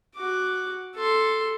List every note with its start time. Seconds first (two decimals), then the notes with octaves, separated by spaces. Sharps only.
0.16 F#4 D6
0.96 A4 C6